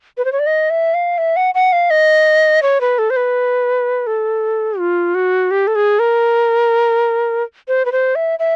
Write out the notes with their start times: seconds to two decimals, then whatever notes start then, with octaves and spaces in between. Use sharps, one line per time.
0.18 B4
0.25 C5
0.32 C#5
0.39 D5
0.46 D#5
0.70 E5
0.94 F5
1.18 E5
1.36 F#5
1.55 F#5
1.73 F5
1.90 D#5
2.62 C#5
2.81 B4
2.99 A4
3.10 C5
3.16 B4
4.07 A4
4.79 F4
5.15 F#4
5.51 G4
5.67 A4
5.75 G#4
5.99 A#4
7.68 C5
7.85 B4
7.92 C5
8.15 E5
8.39 E5